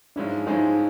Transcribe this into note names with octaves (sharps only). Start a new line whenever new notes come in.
G#2 F3 G#3 C#4 D4 E4
G#2 F3 G#3 C#4 D#4 E4